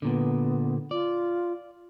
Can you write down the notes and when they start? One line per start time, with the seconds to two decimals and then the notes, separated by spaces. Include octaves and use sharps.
0.02 A#2 D3 B3
0.91 F4 D5